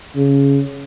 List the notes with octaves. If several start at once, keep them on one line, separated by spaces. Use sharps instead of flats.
C#3